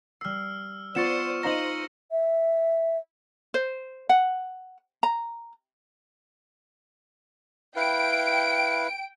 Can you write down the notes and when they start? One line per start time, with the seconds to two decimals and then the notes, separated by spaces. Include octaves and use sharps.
0.21 G3 E6 F6 C7
0.95 B3 F4 C5 D5 C#6 A6 C#7 E7
1.43 D#4 C5 D#5 F5 A#5 A#6 F#7
2.11 E5
3.54 C5
4.09 F#5
5.03 A#5
7.76 E4 B4 F5 G5 D7